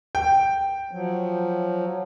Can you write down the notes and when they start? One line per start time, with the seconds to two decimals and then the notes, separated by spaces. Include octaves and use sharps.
0.15 G5
0.91 F3 F#3